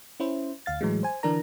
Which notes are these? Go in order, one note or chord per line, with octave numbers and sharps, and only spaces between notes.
C#4 E4 C5
D2 F5 A6
A2 E3 F#3 G#3
C5 G#5
D3 E3 D4 A#4 A#5